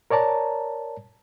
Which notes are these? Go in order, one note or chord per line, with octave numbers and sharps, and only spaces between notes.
A#4 C#5 D5 A5 A#5